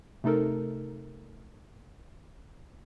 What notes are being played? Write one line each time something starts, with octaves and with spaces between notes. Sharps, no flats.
C3 A3 D#4 A4 A#4